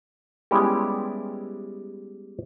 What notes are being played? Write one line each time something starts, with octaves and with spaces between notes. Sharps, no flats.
G3 G#3 B3 C#4 E4 G4